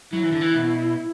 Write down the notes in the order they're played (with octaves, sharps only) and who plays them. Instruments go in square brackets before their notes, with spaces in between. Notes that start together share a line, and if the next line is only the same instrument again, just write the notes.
[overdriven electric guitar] F#3 [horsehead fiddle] E4
[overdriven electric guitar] E3
D3
E3
B2